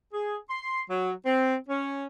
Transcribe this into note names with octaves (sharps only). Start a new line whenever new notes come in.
G#4
C6
F#3
C4
C#4